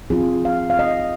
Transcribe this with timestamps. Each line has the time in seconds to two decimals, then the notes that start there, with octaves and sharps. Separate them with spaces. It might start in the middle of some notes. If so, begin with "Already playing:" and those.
0.10 F3 C4 F4 G#4
0.45 F5
0.70 F5
0.79 D#5